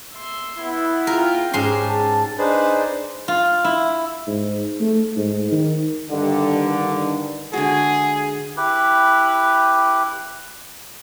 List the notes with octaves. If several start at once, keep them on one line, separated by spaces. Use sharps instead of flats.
E5 C6
B3 E4
F4 A#4 G5
G#2 C#4 G4 C6
A5
D4 D#4 G#4 B4 C5
F4
E4
G#2
A3
G#2
D#3
G2 D3 D#3
D3 G#3 F#4 G#4
E4 G4 B4